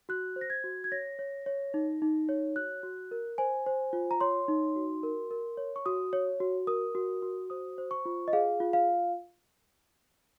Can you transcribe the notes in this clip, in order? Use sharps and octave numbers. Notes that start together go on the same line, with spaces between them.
F#4 F#6
C5
A#6
G#6
F#4
G#6
C#5 A#6
C#5
C#5
D#4
D#4
C#5
F#4 F#6
F#4
A#4
C5 G#5
C5
F4
A#5
C#5 C6
D#4
F#4
A#4
A#4
C#5
C#6
F#4 D#6
C#5
F#4
A#4 D#6
F#4
F#4
C5 D#6
C5
C#6
F4
D#5
G#4 F5
F4
F5